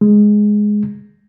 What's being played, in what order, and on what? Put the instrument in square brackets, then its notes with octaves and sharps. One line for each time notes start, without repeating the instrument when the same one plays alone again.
[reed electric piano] G#3